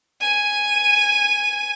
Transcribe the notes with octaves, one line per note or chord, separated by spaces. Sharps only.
G#5 D#7